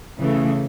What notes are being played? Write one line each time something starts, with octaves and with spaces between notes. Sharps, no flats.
C#3 E3 A3